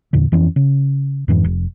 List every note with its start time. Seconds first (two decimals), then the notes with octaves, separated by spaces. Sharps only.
0.13 E2 A#2 D3
0.32 F2 E3 C#4
0.56 C#3
1.28 F2 G#2 E3
1.45 F1